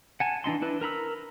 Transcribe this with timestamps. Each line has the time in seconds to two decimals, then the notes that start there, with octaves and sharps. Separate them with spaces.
0.20 F#5 G#5 A5
0.44 E3 D4 D#4 C6
0.62 D4 E4 B4
0.81 A#4 A#5 B5 E6